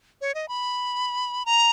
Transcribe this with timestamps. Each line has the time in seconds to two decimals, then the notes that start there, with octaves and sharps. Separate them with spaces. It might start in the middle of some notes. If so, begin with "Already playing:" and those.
0.21 C#5
0.35 D#5
0.49 B5
1.46 A#5